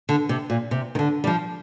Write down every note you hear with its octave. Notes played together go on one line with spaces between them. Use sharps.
D3
C3
A#2
C3
D#3
D3
G3
F3